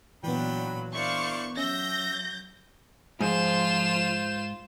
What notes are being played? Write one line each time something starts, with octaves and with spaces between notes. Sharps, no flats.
A#2 E3 F#3 B3 D4 G5 B5
D4 E4 A#4 C5 D5 F5 C#6
F#3 C#4 E5 E6 G6 A#6
G#2 F3 F4 C5 E7